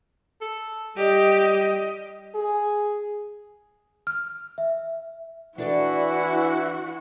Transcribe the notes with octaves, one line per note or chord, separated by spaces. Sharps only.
A4
G3 G4 D#5
G#4
F6
E5
E3 D4 E4 F#4 A4 D5